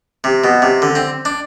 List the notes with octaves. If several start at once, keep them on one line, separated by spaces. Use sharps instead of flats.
C3
B2
C3
D3
C4
D4